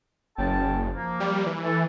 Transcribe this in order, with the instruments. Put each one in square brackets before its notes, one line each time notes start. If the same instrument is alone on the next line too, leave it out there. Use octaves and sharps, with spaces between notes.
[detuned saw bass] F#1 [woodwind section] C#4 G5 A5
[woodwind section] F3 A#3
[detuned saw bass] G3
E3
[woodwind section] A3 A4